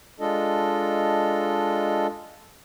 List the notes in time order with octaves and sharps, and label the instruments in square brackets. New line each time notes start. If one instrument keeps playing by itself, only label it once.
[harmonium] G#3 D4 F4 A4 D#5